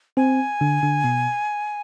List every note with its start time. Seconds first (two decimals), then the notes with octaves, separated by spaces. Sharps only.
0.17 C4 G#5
0.61 D3
0.83 D3
1.04 B2